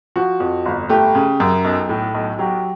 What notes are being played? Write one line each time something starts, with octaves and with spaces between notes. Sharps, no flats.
F3 F#4
F2
G1
A3 G4
C#3
F#2
B1
A2
B1
F#3 G4